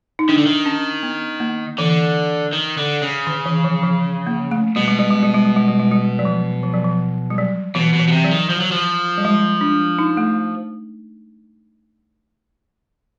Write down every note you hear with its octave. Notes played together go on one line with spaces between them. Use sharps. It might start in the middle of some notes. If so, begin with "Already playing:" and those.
D#4
D#3 D4
D3
D#3
C#4
B3
A#3
D3 E3
D#3
D3
C#3
D#3
E3
F3
F3
A#3
A3
B2 G3
G#3
G3
G#3
G3
G#3
G3
G#3
G3
G#3
G3
F#3
F3
F3
F#3
F3
G3
F#3
B2 E3
B2
E3
B2
C3
F#3
D#3
F3
F#3
F3
G3
G#3
D4
D#4
A3